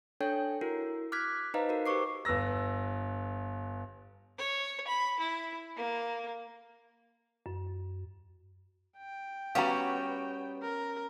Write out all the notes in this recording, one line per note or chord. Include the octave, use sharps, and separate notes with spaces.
D4 A4 C#5 G5 G6
E4 F#4 A#4
D6 F6 F#6 G#6 B6
D#4 B4 C5 D#5 F5 A#5
F#4 A#4
G4 B4 C5 C#6 D6 C7
G1 B4 E6 A#6
C#5
B5
E4
A#3
F#2
G5
G3 B3 C#4 F#4 F5 F#5 A#5
A#4